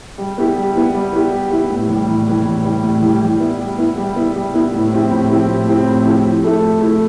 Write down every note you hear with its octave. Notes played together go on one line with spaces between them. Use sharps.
G3
B3 E4 G4
G3
B3 E4 G4
G3
B3 E4 G4
G3
B3 E4 G4
A2
E3
G3
A2
E3 G3
A2
E3 G3
A2
E3 G3
G3
B3 E4
G3
B3 E4
G3
B3 E4
G3
B3 E4
A2
F3 C4 E4 G4
A2
F3 C4 E4 G4
A2
F3 C4 E4 G4
A2
F3 C4 E4 G4
F3
A3 E4 A4
F3
A3 E4 A4